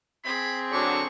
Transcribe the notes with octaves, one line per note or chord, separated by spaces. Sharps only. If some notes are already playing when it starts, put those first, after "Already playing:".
C4 G#4 B5
D3 F#3 D4 C#6